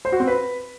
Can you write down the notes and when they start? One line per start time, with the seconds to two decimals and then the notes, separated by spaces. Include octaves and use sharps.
0.05 C5
0.12 F#4
0.20 C4
0.27 B4